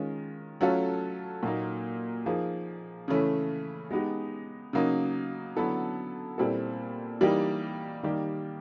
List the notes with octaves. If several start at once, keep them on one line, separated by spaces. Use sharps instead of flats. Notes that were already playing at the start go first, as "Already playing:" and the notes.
Already playing: D#3 G#3 C#4 F4
F#3 A3 C#4 F4 A4
A#2 F#3 A#3 D#4
F3 A#3 D#4 G#4
C#3 E3 A3 C#4
G#3 B3 D#4 G4
C#3 F#3 A#3 D#4
D3 F#3 B3 E4 A4
A#2 G3 C4 E4 A4
E3 G3 A#3 D#4 G4
D#3 G3 A#3 D#4 G4